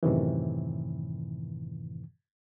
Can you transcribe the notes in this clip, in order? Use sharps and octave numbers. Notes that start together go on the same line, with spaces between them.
F#2 A2 C3 D#3 E3